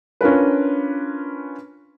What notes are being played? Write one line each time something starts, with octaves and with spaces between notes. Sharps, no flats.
C#4 D4 F4 A#4 B4